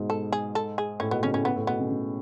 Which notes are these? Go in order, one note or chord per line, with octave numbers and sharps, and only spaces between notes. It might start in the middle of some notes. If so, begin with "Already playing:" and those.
Already playing: G#2 B2
A4
G#4
A4
G#4
A2 C#4
B2 B3
C#3 C#4
A2 C#4
B3
A2
B2 B3
C#3
C#3